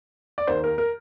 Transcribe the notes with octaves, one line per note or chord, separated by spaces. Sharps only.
D5
D#2 D#3 A#3 C5
A#4
A#4